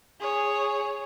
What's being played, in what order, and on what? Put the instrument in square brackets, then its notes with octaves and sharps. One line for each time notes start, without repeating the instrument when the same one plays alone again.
[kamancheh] G#4 C#5